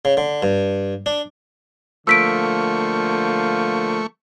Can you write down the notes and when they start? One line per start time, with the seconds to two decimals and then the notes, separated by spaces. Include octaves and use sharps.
0.05 C#3
0.17 D3
0.42 G2
1.06 D4
2.07 D3 F3 A3 A#3 C#6 E6 B6 D7